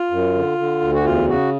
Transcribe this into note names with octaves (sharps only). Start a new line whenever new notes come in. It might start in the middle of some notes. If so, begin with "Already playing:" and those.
Already playing: F4
F#2
D3
D3
D2
F#4
E2 F4
C#3 F#4